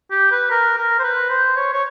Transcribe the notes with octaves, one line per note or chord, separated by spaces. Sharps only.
G4
B4
A#4
A#4
C5
B4
C5
C#5
C#5